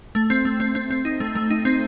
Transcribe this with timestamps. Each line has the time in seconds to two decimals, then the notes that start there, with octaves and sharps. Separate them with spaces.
0.15 A3
0.30 C4
0.45 A3
0.60 C4
0.75 C4
0.91 C4
1.05 D#4
1.20 A3
1.35 A3
1.50 D#4
1.65 C4